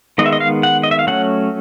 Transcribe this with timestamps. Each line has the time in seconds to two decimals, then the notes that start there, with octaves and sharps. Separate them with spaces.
0.18 D#3 G#3 B3 D#5
0.26 E5
0.33 D#5
0.40 F5
0.63 F#5
0.83 D#5
0.91 E5
0.99 F5
1.07 F#3 A3 C#4 F#5